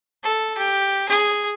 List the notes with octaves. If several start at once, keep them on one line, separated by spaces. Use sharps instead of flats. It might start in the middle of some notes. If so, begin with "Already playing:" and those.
A4
G4
G#4